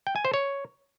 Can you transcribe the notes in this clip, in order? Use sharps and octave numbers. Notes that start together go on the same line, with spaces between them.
G5
G#5
C5
C#5